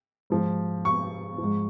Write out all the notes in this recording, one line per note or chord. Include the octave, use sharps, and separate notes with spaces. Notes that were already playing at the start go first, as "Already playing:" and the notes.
G#2 F3
C#6
G#2 F3